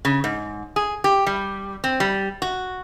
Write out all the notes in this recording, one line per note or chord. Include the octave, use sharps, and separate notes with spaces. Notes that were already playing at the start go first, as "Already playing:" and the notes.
C#3
G#2
G#4
G4
G3
C4
G3
F#4